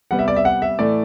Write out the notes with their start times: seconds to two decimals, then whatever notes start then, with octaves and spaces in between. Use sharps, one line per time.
0.11 C3 G3 B3 F#5
0.19 E5
0.28 D5
0.36 E5
0.45 F#5
0.62 E5
0.79 A2 E3 A3 D5